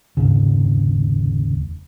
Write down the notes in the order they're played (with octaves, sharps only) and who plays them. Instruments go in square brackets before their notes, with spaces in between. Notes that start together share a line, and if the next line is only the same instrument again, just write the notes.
[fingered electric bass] F1 D#2 G#2 C#3